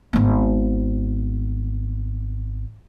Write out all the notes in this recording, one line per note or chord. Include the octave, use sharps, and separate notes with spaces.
G#1 B3